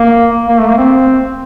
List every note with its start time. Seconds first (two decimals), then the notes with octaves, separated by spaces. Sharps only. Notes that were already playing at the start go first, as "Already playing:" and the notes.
Already playing: A#3
0.48 A#3
0.58 A3
0.69 A#3
0.78 C4